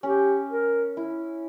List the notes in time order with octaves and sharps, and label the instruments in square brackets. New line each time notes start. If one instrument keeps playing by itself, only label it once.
[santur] C#4 [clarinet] G4
[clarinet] A#4
[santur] E4